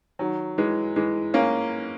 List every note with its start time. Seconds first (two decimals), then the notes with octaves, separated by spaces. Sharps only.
0.19 D#3 F#3
0.58 E3 G#3
0.96 E3 G#3
1.34 A#3 C#4